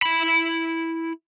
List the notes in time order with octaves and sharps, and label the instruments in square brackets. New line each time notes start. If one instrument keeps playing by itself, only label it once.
[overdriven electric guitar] E4 B5